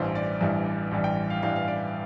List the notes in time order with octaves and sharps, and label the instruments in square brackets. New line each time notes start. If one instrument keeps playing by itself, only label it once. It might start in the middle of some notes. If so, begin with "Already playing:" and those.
Already playing: [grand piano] A1 G2 E3 G3 C5
D5
A1 G2 E3 G3 E5
A1 G2 E3 G3
G5
F5
A1 G2 E3 G3 F5
F5
D5